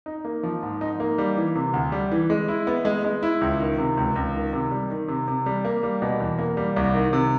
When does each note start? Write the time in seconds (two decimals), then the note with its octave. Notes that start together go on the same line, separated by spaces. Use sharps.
0.06 D#4
0.25 A#3
0.43 F3
0.63 G#2
0.81 D#4
1.00 A#3
1.18 G3
1.37 E3
1.55 C3
1.74 D2
1.92 G3
2.11 E3
2.30 G#3
2.48 E4
2.67 B3
2.85 G#3
3.04 G#3
3.23 E4
3.42 C#2
3.60 D#3
3.78 C3
3.97 C#2
4.16 C#2
4.34 D#3
4.53 C3
4.71 G3
4.90 D#3
5.08 C3
5.28 C3
5.46 G3
5.65 A#3
5.83 G3
6.02 B2
6.20 E2
6.39 A#3
6.57 G3
6.76 C2
6.95 D#3
7.13 C3